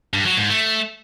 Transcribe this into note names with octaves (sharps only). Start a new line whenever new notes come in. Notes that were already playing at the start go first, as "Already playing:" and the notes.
G2
F#3
G#2
A3